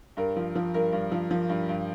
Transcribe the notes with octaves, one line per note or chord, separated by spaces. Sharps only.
G2 A#4
F3
F3
G2 A#4
G2
F3
F3
G2
G2